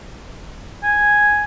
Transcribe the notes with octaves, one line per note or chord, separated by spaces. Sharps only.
G#5